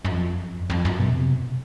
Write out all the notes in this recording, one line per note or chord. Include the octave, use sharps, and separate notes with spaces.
F#2
F2
F#2
F2
F#2
B2
C3